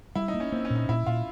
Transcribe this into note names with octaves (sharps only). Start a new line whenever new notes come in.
G3 E4
D#4
A#3
C#4
A#3 C4
C#4
A#2
D#4
A#2 E4
A#2 F4